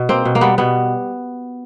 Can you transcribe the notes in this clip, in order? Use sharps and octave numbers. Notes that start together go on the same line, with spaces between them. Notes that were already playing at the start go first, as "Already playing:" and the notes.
Already playing: B2
A#3 C4
B2
A#3
G3 B3
B2 B3